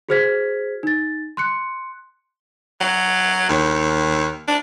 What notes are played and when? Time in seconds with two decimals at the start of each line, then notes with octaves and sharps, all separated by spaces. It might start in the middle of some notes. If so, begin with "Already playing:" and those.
0.09 F#4 G#4 C5 F6 G#6 B6
0.83 D#4 A6
1.37 C6 F#6 C#7
2.81 F#3
3.49 D#2
4.48 D4